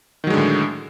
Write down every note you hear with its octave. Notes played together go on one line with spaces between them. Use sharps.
A2 D3 D#3 F#3 G#3